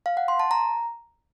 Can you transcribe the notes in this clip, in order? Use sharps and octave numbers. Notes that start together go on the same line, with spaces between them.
F5
F#5
C6
A5
A#5